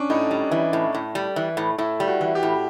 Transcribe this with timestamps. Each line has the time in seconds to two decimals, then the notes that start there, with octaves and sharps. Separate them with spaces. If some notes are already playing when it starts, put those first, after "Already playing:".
Already playing: C#4 D4
0.10 A2 D#4
0.31 G3
0.51 E3
0.73 A2
0.95 A2
1.15 G3
1.36 E3
1.57 A2
1.78 A2 E4
2.00 G3
2.07 F#4
2.21 E3
2.35 G4
2.43 A2